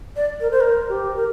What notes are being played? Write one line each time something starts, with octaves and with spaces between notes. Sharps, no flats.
D5
A#4
C5
A#4
G4
A#4